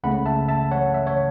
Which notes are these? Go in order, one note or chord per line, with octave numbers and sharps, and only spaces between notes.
C#2 C#3 A3 C#4 F#5 B5
E5 A5
E5 A5
C#5 F#5
E5
C#5